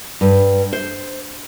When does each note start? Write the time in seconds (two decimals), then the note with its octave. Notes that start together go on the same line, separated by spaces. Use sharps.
0.21 G2
0.73 C5